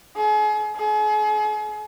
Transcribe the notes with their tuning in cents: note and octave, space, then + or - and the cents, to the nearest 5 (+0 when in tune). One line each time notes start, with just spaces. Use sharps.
G#4 +35
G#4 +40